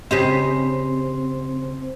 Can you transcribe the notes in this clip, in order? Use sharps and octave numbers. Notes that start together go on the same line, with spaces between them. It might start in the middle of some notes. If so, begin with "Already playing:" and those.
C#3 C4 G4 C5 D#5